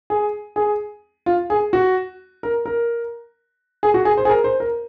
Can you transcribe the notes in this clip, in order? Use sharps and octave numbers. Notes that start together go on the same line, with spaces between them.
G#4
G#4
F4
G#4
F#4
A#4
A#4
G#4
F#4
G#4
C5
G#4
A#4
C5
A#4